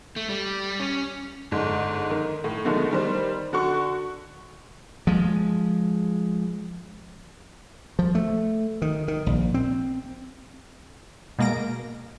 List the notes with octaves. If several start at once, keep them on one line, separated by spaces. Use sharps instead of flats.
A3
G3
C#4
G1 G#2
D#3
A2
B2 D3 D#3 G#3 A3
D#3 G3 C5
D3 F#4 C#6
F3 G#3
F3
A3
D#3
D#3
A#1
C4
B2 G#3 A#3 A#6 D7